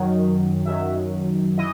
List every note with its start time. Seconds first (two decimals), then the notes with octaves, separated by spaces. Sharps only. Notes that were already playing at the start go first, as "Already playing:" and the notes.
Already playing: F#2 D#3 F#3
0.65 F#2 D#3 F#3 E5
1.58 E3 D#5